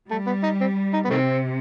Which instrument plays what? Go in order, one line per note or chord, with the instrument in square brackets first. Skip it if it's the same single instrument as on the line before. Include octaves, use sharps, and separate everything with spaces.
[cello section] G3 [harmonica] A3
[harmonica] B3
D#4
C4
D#4
B3
[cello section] C3 [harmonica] D#3 A3 C4